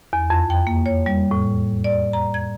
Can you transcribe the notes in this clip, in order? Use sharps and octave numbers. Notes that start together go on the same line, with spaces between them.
E2
F2
G5
A#3
C#5
G3
A2
D5
A#5
G#6